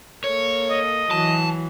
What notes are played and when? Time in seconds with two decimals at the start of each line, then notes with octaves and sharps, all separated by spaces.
0.24 A#3 A4 A#4 C#5
0.70 D#5
1.11 E3 F#3 A5